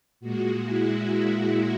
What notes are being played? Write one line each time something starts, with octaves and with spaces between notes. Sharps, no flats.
A#2 G#3 F#4
E4